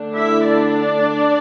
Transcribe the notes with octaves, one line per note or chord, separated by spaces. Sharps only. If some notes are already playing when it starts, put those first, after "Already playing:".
Already playing: D3 A3 D4
E4 E5
D4 D5